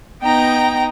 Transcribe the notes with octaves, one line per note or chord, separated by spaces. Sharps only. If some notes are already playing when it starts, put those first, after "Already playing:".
B3 D#4 G5 A#5